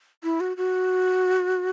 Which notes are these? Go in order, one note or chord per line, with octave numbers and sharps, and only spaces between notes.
E4
F#4
F#4